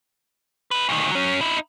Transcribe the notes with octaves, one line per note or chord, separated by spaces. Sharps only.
D#4 B4
D2 D#3
F#3 C#4
D#4 E4